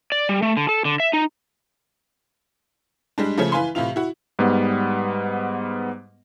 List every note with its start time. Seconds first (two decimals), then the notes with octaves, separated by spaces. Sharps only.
0.12 D5
0.29 G3
0.42 A3
0.57 D3
0.69 A4
0.85 D3
1.00 E5
1.13 D#4
3.18 G3 G#3 D4
3.38 C#3 F3 A3 C#4
3.52 E3 B4 F5 G#5 C6
3.75 A2 C3 E3 E4 F4 F7
3.96 E4 F#4
4.39 G#2 G3 B3